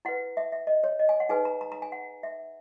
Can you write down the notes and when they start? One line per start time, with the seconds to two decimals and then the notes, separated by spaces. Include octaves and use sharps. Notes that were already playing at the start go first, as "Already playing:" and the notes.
0.05 E4 B4 F#5
0.37 E5
0.52 E5
0.67 D#5
0.84 C#5
0.99 D#5
1.09 G#5
1.20 F#5
1.29 D#4 G#4 B4 G#5
1.45 A#5
1.61 A#5
1.72 A#5
1.82 G#5
1.92 F#5
2.23 E5